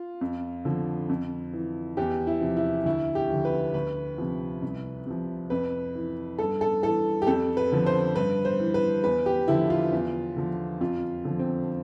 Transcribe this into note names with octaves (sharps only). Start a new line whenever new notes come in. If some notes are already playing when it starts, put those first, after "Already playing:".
Already playing: F4
F2
D3 F3
F2
E3
E2 G4
E4
C3 F3
E4
D2 E4
G4
D3 F3
B4
D2 B4
C3 F3
C2
C3 F3
F2 B4
E3
G2 A4
A4
E3 A4
G4
F2 A4
B4
D3 F3
C5
G2 B4
C5
E3
B4
E2 B4
G4
D3 F3 E4
F4
E2
D3 F3
F2 F4
D3 F3
C4